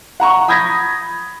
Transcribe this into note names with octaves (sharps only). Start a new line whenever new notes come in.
F#5 A#5 C#6
B5 D#6 G6 G#6 A#6 B6